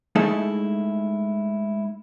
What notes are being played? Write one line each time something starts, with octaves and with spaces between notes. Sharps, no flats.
G#3 A3 D#4 E4 A4 E5